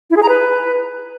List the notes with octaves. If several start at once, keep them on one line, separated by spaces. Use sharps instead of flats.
E4
G#4
A#5
B4